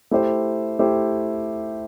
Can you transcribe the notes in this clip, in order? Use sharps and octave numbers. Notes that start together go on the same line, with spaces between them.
A3 E4 G4 C5
A3 E4 G4 C5